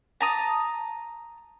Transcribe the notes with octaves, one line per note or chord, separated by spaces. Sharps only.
A5 A#5 D#6